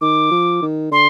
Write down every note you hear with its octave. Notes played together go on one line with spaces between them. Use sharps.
D#3 D6
F3
D#3
D3 C6